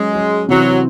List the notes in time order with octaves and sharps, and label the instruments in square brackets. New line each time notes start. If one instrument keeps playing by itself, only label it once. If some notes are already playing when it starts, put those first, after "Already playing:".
Already playing: [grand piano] F#3 C#4 G#4 [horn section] G#3
[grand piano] F#3 C#4 G#4
[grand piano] C3 E3 C4 [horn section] F#3